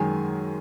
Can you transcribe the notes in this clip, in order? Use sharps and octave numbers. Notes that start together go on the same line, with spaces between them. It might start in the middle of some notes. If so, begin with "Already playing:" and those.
Already playing: F#2 D#3 G#3 G#5